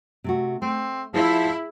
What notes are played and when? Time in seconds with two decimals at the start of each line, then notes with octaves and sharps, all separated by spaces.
0.24 C3 A3 F#4
0.62 A3 C4
1.14 F3 E4 G#4